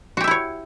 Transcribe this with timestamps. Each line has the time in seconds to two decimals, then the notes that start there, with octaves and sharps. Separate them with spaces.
0.17 F#4
0.21 G4
0.24 E5
0.27 E4
0.31 C#5